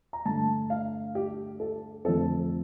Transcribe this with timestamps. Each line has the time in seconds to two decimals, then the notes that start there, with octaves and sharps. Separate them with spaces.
0.13 A#5
0.25 G2 D3 A3 A5
0.70 F5
1.15 G4
1.60 A4
2.05 F2 D3 F3 A3 C4 A4